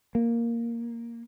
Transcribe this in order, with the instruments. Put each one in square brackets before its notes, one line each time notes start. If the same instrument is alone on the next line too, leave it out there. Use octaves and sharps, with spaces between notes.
[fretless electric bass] A#3